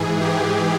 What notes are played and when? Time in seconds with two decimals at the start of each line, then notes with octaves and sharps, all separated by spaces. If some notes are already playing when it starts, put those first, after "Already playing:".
Already playing: G#2 E3 G#4
0.21 G4